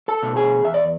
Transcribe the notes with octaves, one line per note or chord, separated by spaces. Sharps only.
A4 A5
B2 A3
G#4 G#5
E2 E5
D5